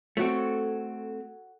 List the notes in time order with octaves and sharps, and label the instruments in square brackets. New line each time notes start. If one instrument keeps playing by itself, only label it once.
[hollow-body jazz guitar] A3 C4 [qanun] F#4 A4 C#5